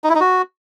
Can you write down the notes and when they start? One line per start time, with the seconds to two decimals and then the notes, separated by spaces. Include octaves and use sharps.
0.04 D#4
0.09 E4
0.15 D#4
0.20 F#4